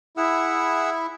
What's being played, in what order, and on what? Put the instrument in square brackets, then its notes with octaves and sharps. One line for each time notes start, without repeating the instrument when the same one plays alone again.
[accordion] E4 [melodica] G#4 F#5 E6